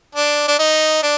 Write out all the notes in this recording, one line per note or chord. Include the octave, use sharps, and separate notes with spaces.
D4
D4
D#4
D4